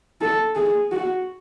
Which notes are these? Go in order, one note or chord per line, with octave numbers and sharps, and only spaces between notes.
A4
G#4
F#4